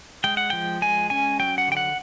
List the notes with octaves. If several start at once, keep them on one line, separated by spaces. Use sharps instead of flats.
G#3 G5
F#5
F3 G5
G#3 G#5
C#4 G#5
F#3 G5
F#5
D3 G5
F#5